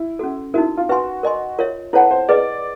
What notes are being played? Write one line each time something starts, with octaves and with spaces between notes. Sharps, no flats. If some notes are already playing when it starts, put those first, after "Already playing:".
Already playing: E4
C#4 F#4 A4
D#4 E4 F#4 A#4
F4
F#4 B4 E5 G#5 C6
A#4 D#5 G#5 C6
F4 A#4 C#5 E5
E4 A4 B4 C#5 F#5 A5
C5
G#4 B4 D5 D#5